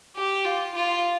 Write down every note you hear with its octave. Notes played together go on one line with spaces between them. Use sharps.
G4
F4
F4